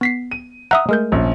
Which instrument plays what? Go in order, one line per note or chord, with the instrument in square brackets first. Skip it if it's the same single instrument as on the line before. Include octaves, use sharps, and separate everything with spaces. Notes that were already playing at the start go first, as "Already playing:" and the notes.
[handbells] B3 B6 C7
[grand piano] D#7
[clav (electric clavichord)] E5 F#5 [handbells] A#5 D#6
[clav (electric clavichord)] G#3 [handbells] A3 A#4 G6
[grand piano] A#1 C#4